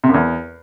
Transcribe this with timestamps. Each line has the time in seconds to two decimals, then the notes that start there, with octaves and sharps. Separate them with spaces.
0.04 C3
0.09 F#2
0.14 E2